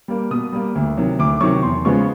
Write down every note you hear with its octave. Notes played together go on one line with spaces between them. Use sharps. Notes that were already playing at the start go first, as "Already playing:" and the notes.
G3 A#3
B2 D#6
G3 A#3
D2
C3 D#3 F#3
D2 D6
C3 D#3 F#3 C#6
E2 C6
C#3 F3 G#3 B3 C#6